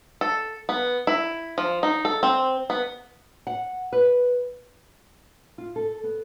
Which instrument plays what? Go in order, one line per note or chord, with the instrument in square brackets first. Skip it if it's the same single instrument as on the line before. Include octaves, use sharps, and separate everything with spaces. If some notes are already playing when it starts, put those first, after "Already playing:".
[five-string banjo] A4
B3
E4
F3
D#4
A4
C4
B3
[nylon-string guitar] F#5
B4
F4
A4
B3